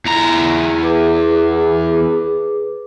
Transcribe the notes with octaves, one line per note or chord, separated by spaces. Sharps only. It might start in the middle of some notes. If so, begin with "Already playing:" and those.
E2 A#5
G#4 B4 D6